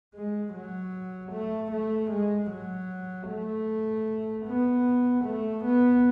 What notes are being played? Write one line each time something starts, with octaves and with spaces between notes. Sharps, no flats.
G#3
F#3
A3
A3
G#3
F#3
A3
B3
A3
B3